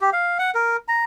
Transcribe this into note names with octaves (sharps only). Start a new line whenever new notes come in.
G4
F5
F#5
A#4
A#5